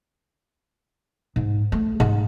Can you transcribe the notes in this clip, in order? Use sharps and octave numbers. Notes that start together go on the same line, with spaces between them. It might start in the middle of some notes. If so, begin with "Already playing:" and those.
G#2
A3
G#2